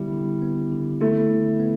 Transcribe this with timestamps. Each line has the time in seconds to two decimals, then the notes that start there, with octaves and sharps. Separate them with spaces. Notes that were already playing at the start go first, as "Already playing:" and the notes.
Already playing: D3 G3 B3 E4
0.12 D3
0.42 B3
0.71 D3
1.01 A3 E4
1.30 D3
1.60 B3